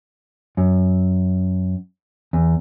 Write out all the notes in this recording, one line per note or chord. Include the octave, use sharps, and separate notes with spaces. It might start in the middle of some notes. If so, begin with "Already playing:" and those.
F#2
E2